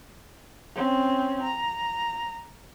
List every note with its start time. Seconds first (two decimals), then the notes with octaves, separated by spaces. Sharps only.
0.75 C4 C#4
1.43 A#5